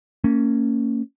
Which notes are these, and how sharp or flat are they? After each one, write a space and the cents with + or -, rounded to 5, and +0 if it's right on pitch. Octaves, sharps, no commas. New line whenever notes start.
A#3 -30 C#4 +0